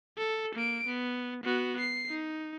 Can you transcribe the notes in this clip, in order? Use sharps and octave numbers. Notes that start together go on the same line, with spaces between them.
A4
A#3 D7
B3
B3 F#4
C7
D#4